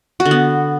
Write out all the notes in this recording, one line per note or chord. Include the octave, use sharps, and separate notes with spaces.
F#4
D3
B3